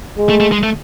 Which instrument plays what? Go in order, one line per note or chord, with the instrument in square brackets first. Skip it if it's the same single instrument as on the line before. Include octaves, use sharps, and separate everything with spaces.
[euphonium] G#3
[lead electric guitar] A3
A3
G#3
A3